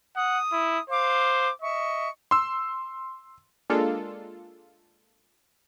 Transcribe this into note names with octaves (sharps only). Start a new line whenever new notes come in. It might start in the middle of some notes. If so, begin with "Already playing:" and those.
F#5 D#6
E4
C5 F5 D6
D#5 E5 C#6
C6 E6
G#3 A#3 D4 F4 A4